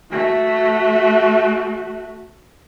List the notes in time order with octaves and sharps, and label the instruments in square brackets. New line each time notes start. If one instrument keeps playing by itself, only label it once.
[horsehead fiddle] A3 F#4